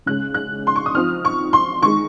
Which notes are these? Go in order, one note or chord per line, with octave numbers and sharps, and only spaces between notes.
C#3 G#3 C#4 F#6
F#6
C6
C#6
D#6
F3 C4 D#4 F6
C#6
C6
D#3 G#3 D#4 C#6